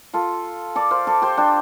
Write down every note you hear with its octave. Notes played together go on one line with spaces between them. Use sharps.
F4 A4
A4 D5
C5 F5
A4 D5
G4 C5
D4 G4